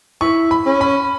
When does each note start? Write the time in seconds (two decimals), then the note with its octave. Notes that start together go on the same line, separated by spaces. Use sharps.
0.21 E4 C#6
0.51 B5
0.66 C#4
0.81 B5